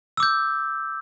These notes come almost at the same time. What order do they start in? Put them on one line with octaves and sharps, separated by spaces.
E6 D6 G6